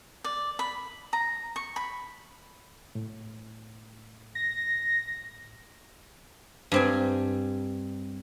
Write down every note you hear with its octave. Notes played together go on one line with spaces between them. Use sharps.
D5
B5
A#5
C#6
B5
A2
A#6
G2 C4 G#5